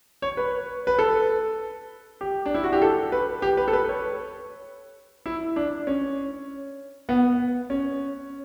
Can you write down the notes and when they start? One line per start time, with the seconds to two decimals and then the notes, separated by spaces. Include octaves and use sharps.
0.22 C#5
0.37 B4
0.87 B4
0.99 A4
2.21 G4
2.46 D4
2.55 E4
2.64 F#4
2.73 G4
2.82 A4
3.12 B4
3.42 G4
3.57 B4
3.68 A4
3.73 B4
3.89 C#5
5.26 E4
5.56 D4
5.87 C#4
7.09 B3
7.70 C#4